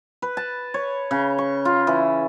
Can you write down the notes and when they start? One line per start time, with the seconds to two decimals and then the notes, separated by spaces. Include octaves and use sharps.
0.22 B4
0.37 A5
0.74 C#5
1.11 C#3
1.38 C#6
1.65 F4
1.87 E3